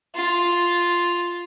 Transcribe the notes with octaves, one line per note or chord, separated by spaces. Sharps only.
F4